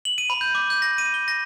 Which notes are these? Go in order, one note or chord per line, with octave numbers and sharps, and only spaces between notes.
F#7
D#7
B5
G6
D6
G6
A#6
D#7
G7
A#6